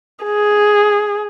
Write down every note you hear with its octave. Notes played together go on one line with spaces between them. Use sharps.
G#4